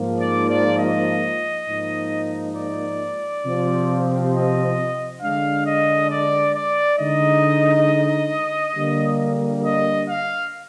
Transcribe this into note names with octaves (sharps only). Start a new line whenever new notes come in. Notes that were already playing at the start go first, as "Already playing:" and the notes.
Already playing: G#2 F3 A#3
D5
D5
D#5
G#2 F3 A#3 D#4
D5
C3 F3 C4
D#5
D3 G#3 D4 F5
D#5
D5
D5
D3 G#3 D#4 D#5
D3 G3 A#3
D#5
F5